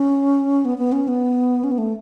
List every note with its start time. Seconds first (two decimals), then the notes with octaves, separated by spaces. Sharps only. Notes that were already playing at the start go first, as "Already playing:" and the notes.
Already playing: C#4
0.65 B3
0.78 B3
0.92 C#4
1.08 B3
1.64 C#4
1.72 B3
1.78 A3